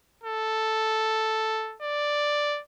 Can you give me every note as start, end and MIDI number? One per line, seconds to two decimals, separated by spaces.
0.24 1.75 69
1.82 2.60 74